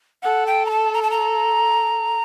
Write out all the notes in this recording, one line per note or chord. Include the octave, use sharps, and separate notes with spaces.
A4 F#5
G5
A#5
A5
A#5
A5
A#5